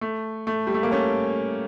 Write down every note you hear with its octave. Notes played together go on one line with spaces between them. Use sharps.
A3
A3
G3
A3
A#3
A3 C#4